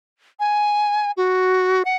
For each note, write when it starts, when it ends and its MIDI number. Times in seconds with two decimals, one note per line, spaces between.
0.40 1.11 80
1.17 1.83 66
1.85 1.97 78